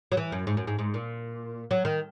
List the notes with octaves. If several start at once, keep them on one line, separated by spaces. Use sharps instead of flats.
F#3
E3
F#2
G#2
F#2
G#2
G#2
A#2
F#3
D#3